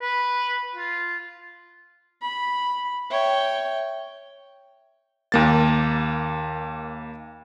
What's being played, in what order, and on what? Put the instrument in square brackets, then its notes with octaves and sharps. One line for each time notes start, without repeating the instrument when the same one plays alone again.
[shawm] B4
F4
[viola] B5
[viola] C#5 G5 [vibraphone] E5
[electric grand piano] D#2 A#3 A6